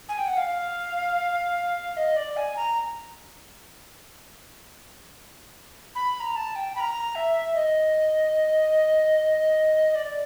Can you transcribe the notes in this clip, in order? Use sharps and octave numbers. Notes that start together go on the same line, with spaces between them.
G#5
G5
F#5
F5
D#5
D5
G#5
A#5
B5
B5
A#5
A5
G5
B5
A#5
E5
D#5
D5